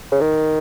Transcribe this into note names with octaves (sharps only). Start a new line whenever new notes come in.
C#3
D#3